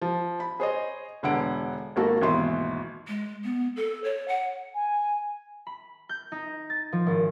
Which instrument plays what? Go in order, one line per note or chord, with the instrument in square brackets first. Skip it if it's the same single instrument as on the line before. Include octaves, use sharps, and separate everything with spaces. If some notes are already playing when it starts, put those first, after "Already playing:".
[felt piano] F3
B5
G#4 C5 C#5 D#5
E1 D3 B3 F#5 D7
G#1 A#3 F#4 A4
G#1 D#2 B2 E3 C6
[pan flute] G#3
B3
A4
C#5
F#5
[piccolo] G#5
[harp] B5
G6
D#4
A6
F3
G#1